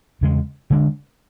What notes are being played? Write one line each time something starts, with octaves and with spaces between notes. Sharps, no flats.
E2 C#3 G#3
D3 G#3 D4